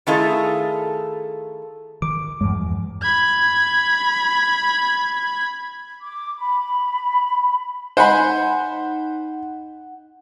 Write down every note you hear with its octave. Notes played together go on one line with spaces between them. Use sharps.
D#3 A3 E4 F4 G#4 A4
D#3 D6
E2 G2 F3 G#3
B5 G#6
D6
B5
D#4 C5 F#5 G#5 B5